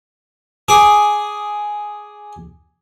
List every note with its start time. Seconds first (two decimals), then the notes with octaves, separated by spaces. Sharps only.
0.68 G#4 D6